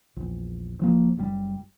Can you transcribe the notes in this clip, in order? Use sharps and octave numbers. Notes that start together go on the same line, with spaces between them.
A#1 E2
E1 F3 A#3
F#1 A2 G3